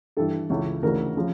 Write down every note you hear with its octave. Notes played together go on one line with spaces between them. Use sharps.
G2 E3 A4
C#2 C#3 E3
D2 C#3 E3 A#4
C#3 F3